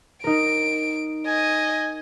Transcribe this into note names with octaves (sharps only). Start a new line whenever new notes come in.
D#4 A#4 D7
D#5 G#5